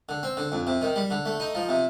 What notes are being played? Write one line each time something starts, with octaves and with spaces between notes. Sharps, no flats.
D3
C4
D3
F2
C3
D#3
G3
D3
A3
D#4
F3
C3